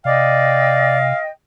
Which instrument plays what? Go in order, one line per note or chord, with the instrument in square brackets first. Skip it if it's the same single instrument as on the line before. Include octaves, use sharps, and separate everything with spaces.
[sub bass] C3 [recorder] D5 [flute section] D#5 G5 [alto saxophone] F5